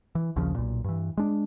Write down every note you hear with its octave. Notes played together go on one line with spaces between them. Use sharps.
E3
A#1 D#2 C#3 F3
B1 A#2
G2 E3
G#3 D4